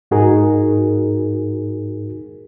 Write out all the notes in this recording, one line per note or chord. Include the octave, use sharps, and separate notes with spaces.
G#2 D#4 F#4 G#4 A#4